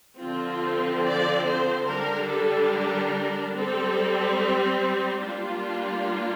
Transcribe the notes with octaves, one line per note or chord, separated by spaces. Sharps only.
D3 F3 C4 F4
D5
C5
D3 G3 D4 A#4
A4
A#4
G3 C4 A4
G4
G3 A#3 D4 F4